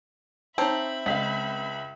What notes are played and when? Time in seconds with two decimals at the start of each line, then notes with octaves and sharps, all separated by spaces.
0.58 C4 D#4 C#5 E5 A5 B5
1.06 C#2 D#5 F5 B6